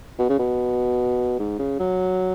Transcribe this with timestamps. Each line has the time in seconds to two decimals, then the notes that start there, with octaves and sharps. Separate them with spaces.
0.18 B2
0.29 C#3
0.39 B2
1.39 G#2
1.59 C#3
1.79 F#3